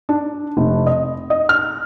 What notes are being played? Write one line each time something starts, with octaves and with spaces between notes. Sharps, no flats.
D4
F1
D#5
D#5
F6